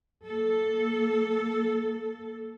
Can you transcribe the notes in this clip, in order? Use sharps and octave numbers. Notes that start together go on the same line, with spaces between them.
A#3 A4